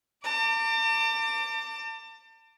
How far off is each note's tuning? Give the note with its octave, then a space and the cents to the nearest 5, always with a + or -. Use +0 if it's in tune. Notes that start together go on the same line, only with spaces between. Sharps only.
A5 +45 D6 +0